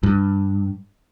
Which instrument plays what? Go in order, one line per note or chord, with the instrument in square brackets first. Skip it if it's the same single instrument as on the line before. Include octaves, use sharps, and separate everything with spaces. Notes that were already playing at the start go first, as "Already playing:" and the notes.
[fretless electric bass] G2